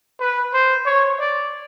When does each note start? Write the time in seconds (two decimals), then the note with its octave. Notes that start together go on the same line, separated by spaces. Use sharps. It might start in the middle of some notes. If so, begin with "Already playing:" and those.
0.20 B4
0.53 C5
0.86 C#5
1.19 D5